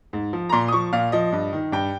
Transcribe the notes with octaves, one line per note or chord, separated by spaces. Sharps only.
G#2
F3
A#5
A#2 C6
D#6
F3 C#6
A#2 F5
F3 D#5
G2
D#3
G2 G5